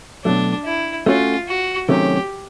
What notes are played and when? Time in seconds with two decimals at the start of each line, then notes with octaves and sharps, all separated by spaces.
0.25 B2 F#3 A3 D4
0.65 E4
1.06 A3 C#4 F4 F#4
1.48 F#4
1.89 C3 D#3 F#3 A3 C#4 G4